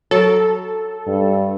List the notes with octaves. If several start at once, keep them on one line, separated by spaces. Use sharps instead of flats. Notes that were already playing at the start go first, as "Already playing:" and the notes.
F#3 A4 A#4
G2